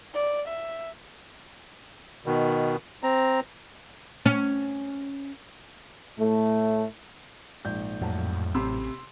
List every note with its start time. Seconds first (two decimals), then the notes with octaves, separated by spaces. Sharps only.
0.14 D5
0.48 E5
2.26 B2 D#3
3.03 C4 A#5
4.26 C#4
6.19 A2 A3
7.65 A#1 G#2 G6
8.01 F2 A2 F#3 A3
8.55 A1 C3 B5 C6 E6